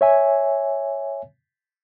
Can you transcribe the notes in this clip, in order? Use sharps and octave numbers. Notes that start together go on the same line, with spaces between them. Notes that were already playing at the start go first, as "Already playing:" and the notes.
C#5 E5 G#5